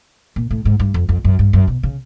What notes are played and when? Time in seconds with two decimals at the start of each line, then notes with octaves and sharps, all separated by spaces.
0.36 A#2
0.51 A2
0.65 G#2
0.80 G2
0.94 F2
1.09 F2
1.24 F#2
1.39 G2
1.53 F#2
1.68 B2
1.83 C#3